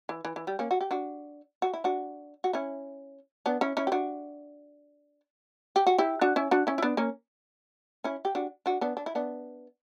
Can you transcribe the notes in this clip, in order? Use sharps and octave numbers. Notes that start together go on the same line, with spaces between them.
E3
E3
E3
G3
A#3 C#4
F#4
G4
D4 F#4
F#4
E4
D4 F#4
F#4
C#4 E4
B3 D4
C#4 E4
C#4 E4
G4
D4 F#4
G4
F#4
E4 G4
D4 F#4
C#4 E4
D4 F#4
C#4 E4
E4
B3 D4
A#3 C#4
C#4 E4
G4
D4 F#4
D4 F#4
B3 D4
D4
E4
B3 D4